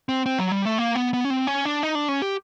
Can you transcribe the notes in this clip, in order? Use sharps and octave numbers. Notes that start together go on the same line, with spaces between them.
C4
C4
F#3
G3
A3
A#3
B3
B3
C#4
C4
C#4
D4
D#4
D4
C#4
G4